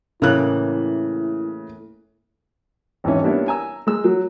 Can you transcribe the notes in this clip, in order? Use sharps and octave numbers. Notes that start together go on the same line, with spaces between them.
A2 C#3 E3 A#3 E4 F#6
G#1 E3 C#4
G3 A#3 B3 D4 E4 C#5
G#5 A#5 E6
G#3 E6
F#3